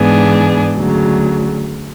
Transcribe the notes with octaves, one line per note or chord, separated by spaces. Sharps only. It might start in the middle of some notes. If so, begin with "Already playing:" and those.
Already playing: G#2 E3 B3 D4 G#4
D2 C#3 F#3